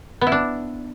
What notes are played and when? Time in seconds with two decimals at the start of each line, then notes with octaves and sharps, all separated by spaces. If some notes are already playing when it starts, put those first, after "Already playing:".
0.21 B3
0.27 E4
0.32 D4